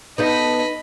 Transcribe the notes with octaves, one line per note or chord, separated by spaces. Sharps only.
B3 D#4 A4 D#5 B5